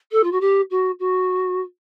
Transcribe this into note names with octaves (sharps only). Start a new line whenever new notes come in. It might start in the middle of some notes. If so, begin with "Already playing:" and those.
A4
F4
F#4
G4
F#4
F#4